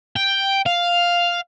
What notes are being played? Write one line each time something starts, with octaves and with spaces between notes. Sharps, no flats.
G5
F5